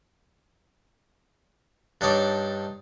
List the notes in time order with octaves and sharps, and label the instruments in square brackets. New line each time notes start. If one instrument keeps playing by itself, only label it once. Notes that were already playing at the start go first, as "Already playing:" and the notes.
[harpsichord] G2 D4 D#4 C#5 D5 D6